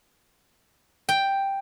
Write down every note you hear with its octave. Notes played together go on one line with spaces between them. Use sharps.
G5